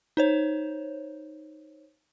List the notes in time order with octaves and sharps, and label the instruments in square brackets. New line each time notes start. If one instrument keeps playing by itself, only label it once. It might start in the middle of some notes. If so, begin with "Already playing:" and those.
[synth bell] D#4 C5 C#5